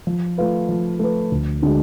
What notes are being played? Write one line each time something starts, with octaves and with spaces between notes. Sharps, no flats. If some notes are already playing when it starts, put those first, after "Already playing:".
F3
A3 F4 B4
F3
A3 F4 B4
D2
D3 G#3 D4 F#4